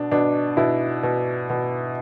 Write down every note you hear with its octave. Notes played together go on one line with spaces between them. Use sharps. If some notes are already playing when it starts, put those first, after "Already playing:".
Already playing: B2 D4
B2 D4
B2 E4
B2
B2